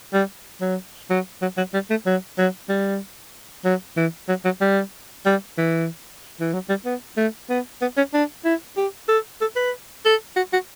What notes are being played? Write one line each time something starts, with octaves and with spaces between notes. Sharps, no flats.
G3
F#3
F#3
F#3
F#3
G3
A3
F#3
F#3
G3
F#3
E3
F#3
F#3
G3
G3
E3
E3
F#3
G3
B3
A3
B3
B3
C#4
D4
E4
G4
A4
A4
B4
A4
F#4
F#4